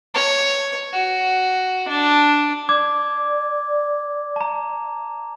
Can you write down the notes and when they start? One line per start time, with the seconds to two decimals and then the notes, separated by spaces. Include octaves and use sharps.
0.14 C#5
0.93 F#4
1.88 D4
2.69 D5 D6 G#6
4.36 A5 A#5